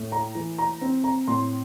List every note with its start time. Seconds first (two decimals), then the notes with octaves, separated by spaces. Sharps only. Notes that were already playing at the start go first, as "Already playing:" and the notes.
Already playing: A2 A3
0.12 A#5
0.35 E3
0.58 A#5
0.81 C4
1.04 A#5
1.28 A2 C6